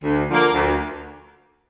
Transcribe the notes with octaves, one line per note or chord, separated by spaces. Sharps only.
D2
D3 F3 A#3
D2